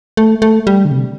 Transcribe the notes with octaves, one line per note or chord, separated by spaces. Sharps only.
A3
A3
G3
D3
C3